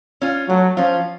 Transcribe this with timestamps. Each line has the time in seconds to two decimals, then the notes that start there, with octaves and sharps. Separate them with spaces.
0.22 C#4 F4
0.49 F#3 A3
0.77 F3 C#4 F4